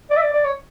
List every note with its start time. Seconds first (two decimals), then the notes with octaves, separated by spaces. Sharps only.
0.10 D5
0.17 E5
0.22 D5
0.33 D5
0.44 C#5